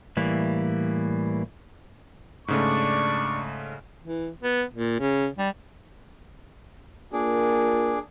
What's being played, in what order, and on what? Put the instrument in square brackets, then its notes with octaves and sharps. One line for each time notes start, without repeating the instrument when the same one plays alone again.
[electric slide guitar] A2 E3 G3 A#3
[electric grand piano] G#2 C#3 A3 [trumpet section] D4 D5 C#6
[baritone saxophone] E3
B3
A#2
C#3
G3
[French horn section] A#3 F4 A#4 [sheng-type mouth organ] D4 G#4